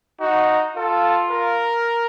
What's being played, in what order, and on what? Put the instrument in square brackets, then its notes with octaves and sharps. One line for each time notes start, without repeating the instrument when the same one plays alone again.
[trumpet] D#4 [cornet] F#4
[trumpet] F4 [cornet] A4
[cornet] A#4